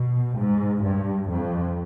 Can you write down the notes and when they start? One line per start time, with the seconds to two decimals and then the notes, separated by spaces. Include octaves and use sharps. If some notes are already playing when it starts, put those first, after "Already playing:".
Already playing: B2
0.37 G#2
0.83 G2
1.30 F2